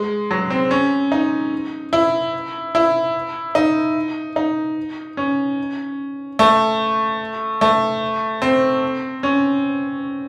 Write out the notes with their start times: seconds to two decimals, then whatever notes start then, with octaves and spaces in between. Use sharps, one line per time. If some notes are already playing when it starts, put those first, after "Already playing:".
Already playing: G#3
0.31 F#3
0.50 C4
0.71 C#4
1.12 D#4
1.93 E4
2.75 E4
3.55 D#4
4.36 D#4
5.17 C#4
6.39 A3
7.61 A3
8.42 C4
9.23 C#4